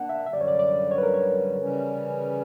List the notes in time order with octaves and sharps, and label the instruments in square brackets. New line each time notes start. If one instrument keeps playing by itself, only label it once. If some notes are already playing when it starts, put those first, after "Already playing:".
Already playing: [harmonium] A#3 D4 [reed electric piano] F#5
[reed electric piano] E5
[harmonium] F#2 D3 G3 [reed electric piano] E5
[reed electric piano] D5
C#5
D5
D5
C#5
B4
A#4
C#5
[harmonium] C#3 E3 G3 C#4